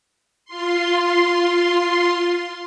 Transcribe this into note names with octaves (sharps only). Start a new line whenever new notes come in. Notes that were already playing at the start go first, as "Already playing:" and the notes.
F4 C6